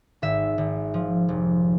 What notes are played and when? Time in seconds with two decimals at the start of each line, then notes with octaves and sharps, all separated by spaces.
0.22 G#1 E5
0.58 G#1
0.94 F3
1.29 F1